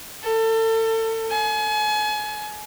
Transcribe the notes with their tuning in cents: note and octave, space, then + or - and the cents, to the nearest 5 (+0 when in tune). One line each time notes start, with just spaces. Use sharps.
A4 +30
G#5 +35